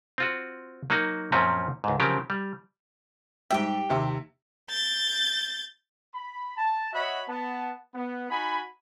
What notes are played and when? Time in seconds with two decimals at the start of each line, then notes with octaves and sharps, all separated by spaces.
0.18 C4 F4 F#4
0.90 F#3 A#3 D#4 F#4
1.32 F#2 A#2 F3 F#3 C4 C#4
1.84 C#2 G#2
2.00 C#3 F3 F#3 C4 G4 A#4
2.30 G3
3.50 G#2 G3 G4 E5 G5
3.89 D#2 C3 E5
4.70 G6 A6
6.14 B5
6.57 A5
6.93 F#4 C#5 D#5 E5 F#5 B5
7.28 B3 A5
7.94 B3
8.30 D#4 F#4 G#5 B5